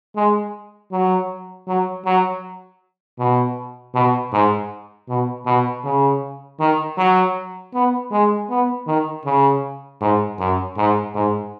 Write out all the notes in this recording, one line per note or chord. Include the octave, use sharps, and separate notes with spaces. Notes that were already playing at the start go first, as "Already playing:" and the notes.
G#3
F#3
F#3
F#3
B2
B2
G#2
B2
B2
C#3
D#3
F#3
B3
G#3
B3
D#3
C#3
G#2
F#2
G#2
G#2